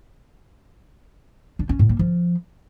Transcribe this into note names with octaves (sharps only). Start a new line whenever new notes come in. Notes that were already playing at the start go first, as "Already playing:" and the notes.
D4
C#4
A2
A#3
F3